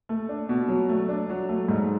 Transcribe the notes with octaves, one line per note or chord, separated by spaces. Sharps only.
A3
D4
B2
F#3
A3
D4
F#3
A3
G#2